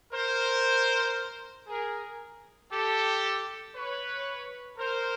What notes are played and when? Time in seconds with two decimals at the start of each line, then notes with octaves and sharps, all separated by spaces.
0.12 A#4 C5
1.68 G#4 A#4
2.71 G4 A4
3.75 B4 C#5
4.78 A#4 C5